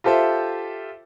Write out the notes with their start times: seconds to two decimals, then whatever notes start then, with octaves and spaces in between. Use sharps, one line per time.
0.04 F4 G4 A4 C5 E5